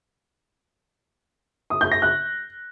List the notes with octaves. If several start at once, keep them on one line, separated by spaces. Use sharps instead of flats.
D#6
G6
A#6
F#6